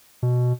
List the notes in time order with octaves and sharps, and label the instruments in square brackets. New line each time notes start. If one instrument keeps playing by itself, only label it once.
[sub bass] B2